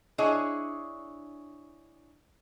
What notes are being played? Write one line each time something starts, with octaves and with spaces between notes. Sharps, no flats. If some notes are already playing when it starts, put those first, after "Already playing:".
D4 E4 G#4 C#5 D#5